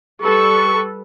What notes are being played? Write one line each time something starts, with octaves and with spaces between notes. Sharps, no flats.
G3 A4 B4 C#6